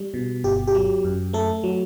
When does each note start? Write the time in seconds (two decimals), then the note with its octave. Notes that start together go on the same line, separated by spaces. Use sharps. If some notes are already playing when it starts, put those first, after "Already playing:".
Already playing: G3
0.14 B2
0.44 G1 G4
0.67 G4
0.74 F#3
1.04 F#2
1.33 A3 A4
1.63 F#3